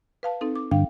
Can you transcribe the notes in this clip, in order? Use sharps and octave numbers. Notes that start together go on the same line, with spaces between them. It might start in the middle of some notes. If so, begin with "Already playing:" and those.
B4 F5 A5
C4 D#4 A4
D6
G2 D3 F5 G5